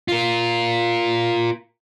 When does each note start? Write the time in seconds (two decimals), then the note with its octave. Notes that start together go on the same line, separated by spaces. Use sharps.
0.08 F4 A#4